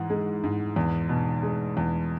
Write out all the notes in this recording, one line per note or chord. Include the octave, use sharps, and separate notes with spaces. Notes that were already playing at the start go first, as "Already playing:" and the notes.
Already playing: G#2 E3 F#5
G#3
G#2
E2
B2
G#3
E2